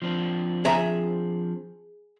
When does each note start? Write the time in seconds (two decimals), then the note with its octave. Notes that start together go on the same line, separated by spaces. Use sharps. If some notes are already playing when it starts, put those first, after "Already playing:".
0.02 F3 C4 D4
0.65 G#4 E5 A#5